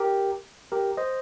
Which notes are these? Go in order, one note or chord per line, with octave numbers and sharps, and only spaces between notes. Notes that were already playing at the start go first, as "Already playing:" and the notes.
Already playing: G4 A#4
G4 A#4
C5 D#5